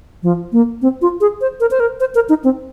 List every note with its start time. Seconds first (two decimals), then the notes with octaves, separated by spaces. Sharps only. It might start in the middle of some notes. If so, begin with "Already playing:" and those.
0.23 F3
0.52 A#3
0.82 C4
1.02 F4
1.21 G#4
1.41 C5
1.60 A#4
1.71 C5
1.80 A#4
2.00 C5
2.15 A#4
2.29 D#4
2.44 C4